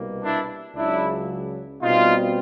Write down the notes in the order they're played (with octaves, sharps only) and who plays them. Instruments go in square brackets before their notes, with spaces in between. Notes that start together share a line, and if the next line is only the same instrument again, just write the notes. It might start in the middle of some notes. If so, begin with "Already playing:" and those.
Already playing: [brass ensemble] C2 B2 G3 A#3
D4 E4
C#2 C#3 F#3 D4 E4
B2 G3 C4 D#4 F4